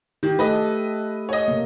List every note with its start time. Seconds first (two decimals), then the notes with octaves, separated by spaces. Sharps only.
0.23 D#3 G4
0.39 A3 A4 B4 D#5
1.29 C#5 D#5
1.48 C3 A#3